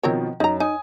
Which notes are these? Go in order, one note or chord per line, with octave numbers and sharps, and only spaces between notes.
B2 D#3 F3 C4 A#4 C#5
F#2 D#4 A#5
D#4 G#5 D#6